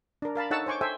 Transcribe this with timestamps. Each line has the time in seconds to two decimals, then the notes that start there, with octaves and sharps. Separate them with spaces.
0.22 D4 A#4
0.35 A#4 F5 A5 B5
0.51 D#4 A4 C#5 F#5 A5 E6
0.66 C5 C#5 G#5 C#6 D6
0.81 A4 C5 E5 G5 G#5